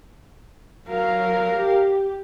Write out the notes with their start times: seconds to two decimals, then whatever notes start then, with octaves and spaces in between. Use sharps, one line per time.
0.88 F#3 A#4 F5
1.54 G4